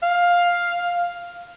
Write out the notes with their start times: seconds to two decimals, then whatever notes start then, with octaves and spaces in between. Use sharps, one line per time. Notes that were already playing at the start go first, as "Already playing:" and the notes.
0.03 F5